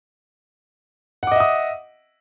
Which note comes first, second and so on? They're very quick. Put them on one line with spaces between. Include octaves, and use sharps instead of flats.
F#5 D6 D#5 E5 D#6